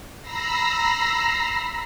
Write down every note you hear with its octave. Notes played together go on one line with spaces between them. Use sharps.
A#5 B5 E6 A#6 C7